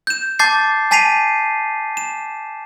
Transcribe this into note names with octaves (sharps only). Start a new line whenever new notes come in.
G6 E7
A5 D6 G6 A6 C7
G#5 A5 B6 C7 D#7 F7
E7